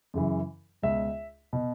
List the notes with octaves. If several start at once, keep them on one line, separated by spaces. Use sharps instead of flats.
F#2 C#3 E3
C#2 B2 E5
B2